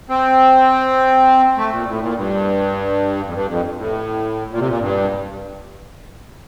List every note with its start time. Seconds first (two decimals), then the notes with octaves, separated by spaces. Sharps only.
0.09 C4
1.57 A3
1.71 A#2
1.87 A2
2.01 A#2
2.15 G2
3.25 F2
3.33 G2
3.48 F2
3.77 A2
4.51 A#2
4.59 C3
4.68 A#2
4.80 G2